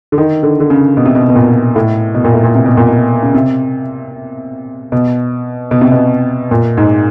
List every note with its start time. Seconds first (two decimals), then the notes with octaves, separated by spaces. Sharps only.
0.12 D3
0.18 D#3
0.43 D3
0.60 D3
0.70 C#3
0.97 B2
1.06 C3
1.15 B2
1.30 B2
1.36 A#2
1.76 A2
2.15 B2
2.24 A#2
2.34 A2
2.43 A#2
2.55 C3
2.66 B2
2.77 A#2
2.88 B2
3.23 C#3
3.35 C3
4.92 B2
5.71 B2
5.81 C3
5.92 B2
6.51 A#2
6.77 G#2